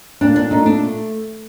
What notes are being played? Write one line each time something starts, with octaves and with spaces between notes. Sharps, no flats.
A#2 D4
D4
A3 D#4
D4